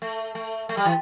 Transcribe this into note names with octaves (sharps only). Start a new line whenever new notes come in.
A3
A3
A3
G3
E3